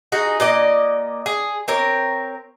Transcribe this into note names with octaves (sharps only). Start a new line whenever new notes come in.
D#4 F#4 G#4
A#2 D5 D#5
G#4
C4 A#4 C#5